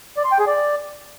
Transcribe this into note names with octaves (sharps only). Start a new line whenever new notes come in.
D5
C6
G5
G#4
D5